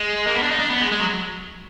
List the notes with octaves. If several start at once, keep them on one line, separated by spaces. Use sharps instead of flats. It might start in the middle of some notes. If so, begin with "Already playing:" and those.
Already playing: G#3
A#3
B3
D4
D#4
D4
B3
G#3
G#3
F#3